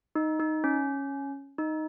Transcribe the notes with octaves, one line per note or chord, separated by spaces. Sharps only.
D#4
D#4
C#4
D#4